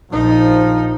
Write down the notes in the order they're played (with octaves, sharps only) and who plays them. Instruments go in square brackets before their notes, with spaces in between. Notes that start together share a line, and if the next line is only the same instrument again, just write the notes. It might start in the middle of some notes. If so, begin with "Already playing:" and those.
[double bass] A#1 D#4 [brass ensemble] F3